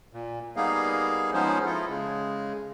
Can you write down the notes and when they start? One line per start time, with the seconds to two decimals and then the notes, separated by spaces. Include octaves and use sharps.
0.13 A#2
0.56 G3 A#3 B3 D#4 G#4 F5
1.33 F3 G#3 B3 C#4 D#4 C5
1.65 E4 F4 A4
1.88 C#3 G#3